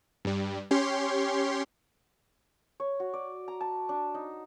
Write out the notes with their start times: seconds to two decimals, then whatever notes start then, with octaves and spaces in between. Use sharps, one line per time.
0.25 G2 G3
0.71 C#4 G4 C#5 C6
2.80 C#5
3.00 F#4
3.14 D5
3.48 A#5
3.61 A5
3.89 D4
4.15 D#4